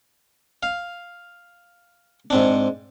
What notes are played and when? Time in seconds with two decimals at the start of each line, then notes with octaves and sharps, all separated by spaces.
0.63 F5
2.30 G#2 C4 D4